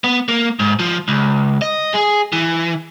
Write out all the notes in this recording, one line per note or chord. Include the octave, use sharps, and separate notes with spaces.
B3
A#3
G#2
F3
C#2
D#5
G#4
E3